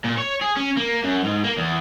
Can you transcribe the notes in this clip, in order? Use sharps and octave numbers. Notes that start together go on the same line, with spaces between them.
A#2
C#5
G#4
C#4
A#3
F#2
G#2
A#3
E2